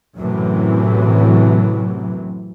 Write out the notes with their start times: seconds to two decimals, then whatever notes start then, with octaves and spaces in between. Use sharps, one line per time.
0.17 F#2 A2 C3 E3 F#3